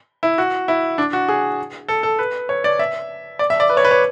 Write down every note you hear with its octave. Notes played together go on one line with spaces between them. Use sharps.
E4
F#4
E4
D4
F#4
G#4
A4
A4
B4
C#5
D5
E5
D5
E5
D5
B4
C#5
B4
C#5